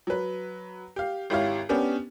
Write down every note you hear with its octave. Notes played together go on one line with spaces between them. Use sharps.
F#3 B4
G4 F5
G#1 E4 G4 C#5 F5
B3 C#4 D4 G4